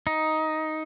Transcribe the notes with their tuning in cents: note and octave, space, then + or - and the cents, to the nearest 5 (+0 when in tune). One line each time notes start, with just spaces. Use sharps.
D#4 +10